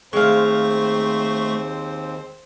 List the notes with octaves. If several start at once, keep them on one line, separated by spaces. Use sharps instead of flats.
D#2 G#3 A3 C4 C5 F5 C#6